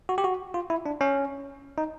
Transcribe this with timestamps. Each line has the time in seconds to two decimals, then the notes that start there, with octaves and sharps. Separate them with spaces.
0.09 F#4
0.18 G4
0.24 F#4
0.54 F4
0.70 E4
0.86 D4
1.01 C#4
1.78 D#4